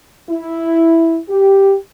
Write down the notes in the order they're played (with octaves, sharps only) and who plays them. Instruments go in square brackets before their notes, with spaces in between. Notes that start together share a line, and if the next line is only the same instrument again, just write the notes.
[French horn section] E4
G4